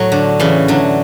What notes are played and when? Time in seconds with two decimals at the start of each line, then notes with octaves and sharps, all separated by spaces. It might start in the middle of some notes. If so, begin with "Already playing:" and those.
Already playing: A2 F#3
0.12 D3
0.40 C#3 E3
0.68 D3 F#3